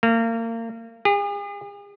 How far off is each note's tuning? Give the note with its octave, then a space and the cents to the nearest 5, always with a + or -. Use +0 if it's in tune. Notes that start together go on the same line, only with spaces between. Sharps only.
A#3 -30
G#4 -45